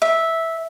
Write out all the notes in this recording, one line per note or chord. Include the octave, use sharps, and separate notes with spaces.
E5